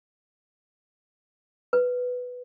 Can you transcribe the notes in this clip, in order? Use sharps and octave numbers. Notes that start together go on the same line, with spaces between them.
B4